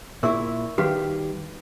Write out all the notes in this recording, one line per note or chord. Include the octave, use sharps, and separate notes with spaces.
A#2 E4 A#4 E5 C#6
D#3 G3 F#4 B4 F5